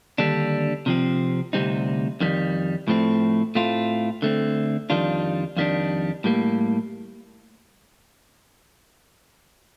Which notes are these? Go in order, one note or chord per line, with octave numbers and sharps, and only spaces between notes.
D#2 D3 G3 D4
C3 F3 C4
D2 C3 G3 C4 D#4
F2 D#3 G3
A2 F3 A3 C4
A2 A3 C4 F4
D3 A3 C4
F2 D#3 G3 D4 F4
F2 D#3 G3 D4
A2 G3 A#3